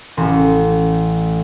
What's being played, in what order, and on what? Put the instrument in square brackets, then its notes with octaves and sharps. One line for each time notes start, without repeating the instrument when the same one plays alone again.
[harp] A1